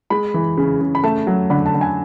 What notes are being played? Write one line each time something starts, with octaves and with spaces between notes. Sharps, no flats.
G#3 B5
E3
C#3
C#3
B5
A3 A5
F#3
D3 B5
A5
D3
G#5